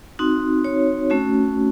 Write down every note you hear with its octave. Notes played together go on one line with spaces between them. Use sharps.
C4 D#4 F#4
C#5
A3 C#4 F#4